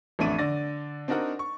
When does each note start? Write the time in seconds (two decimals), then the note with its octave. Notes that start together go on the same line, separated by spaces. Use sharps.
0.19 A1 F2 A3 D4 D#7
0.38 D3 D5 A6 A#6
1.08 C4 D4 D#4 F#4 A#4 F#5
1.39 C#6